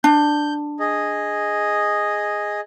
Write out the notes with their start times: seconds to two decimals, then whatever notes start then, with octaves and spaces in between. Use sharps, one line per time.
0.04 D4 G6
0.80 G#4 D#5